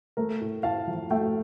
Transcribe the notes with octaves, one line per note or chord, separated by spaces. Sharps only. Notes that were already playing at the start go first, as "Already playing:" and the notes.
A3 A#4
A2
A2 F5 A5
F3
A3 E5 G5